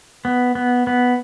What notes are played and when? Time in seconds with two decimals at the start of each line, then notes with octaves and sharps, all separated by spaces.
0.25 B3
0.55 B3
0.87 B3